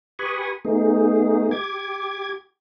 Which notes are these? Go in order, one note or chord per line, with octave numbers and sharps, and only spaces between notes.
G4 B4 G#5 B5 C#6 D#6
A3 B3 D#4 G#4
G4 D6 G#6